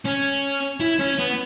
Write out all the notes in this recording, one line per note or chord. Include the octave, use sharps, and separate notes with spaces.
C#4
E4
C#4
B3